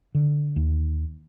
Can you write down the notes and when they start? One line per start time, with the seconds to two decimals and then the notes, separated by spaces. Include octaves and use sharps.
0.15 D3
0.56 D#2